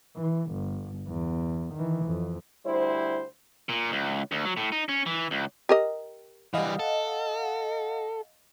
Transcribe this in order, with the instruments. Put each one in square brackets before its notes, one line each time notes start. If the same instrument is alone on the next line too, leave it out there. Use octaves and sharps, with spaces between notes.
[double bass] E3
G1
E2
D#3 E3
F2
[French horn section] D2 G3 E4 C5
[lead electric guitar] A#2
C#2
D2
F#3
A2
D#4
C#4
E3
C#2
[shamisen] G4 A#4 D#5
[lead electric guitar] E3 G3 [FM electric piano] D#5 F5 F#5
[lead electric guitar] A4